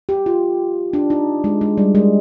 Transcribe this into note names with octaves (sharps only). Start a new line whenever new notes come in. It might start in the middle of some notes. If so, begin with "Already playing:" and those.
G4
F4
D4
D#4
G#3
G#3
G3
G#3